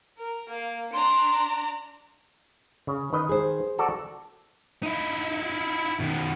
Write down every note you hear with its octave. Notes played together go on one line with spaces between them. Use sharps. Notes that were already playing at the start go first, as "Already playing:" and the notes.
A#4
A#3
D4 A#5 C6
C#3
D#3 B4 D#5
G#4 C5
F#4 A4 D5
D#4 E4
B2 D#3